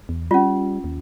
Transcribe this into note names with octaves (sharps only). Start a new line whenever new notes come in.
E2
G3 C#4 F4
D#2